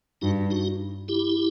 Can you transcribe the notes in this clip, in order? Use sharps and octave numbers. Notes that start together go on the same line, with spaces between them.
G2 D#4 F#4
D#4 F#4
E4 G4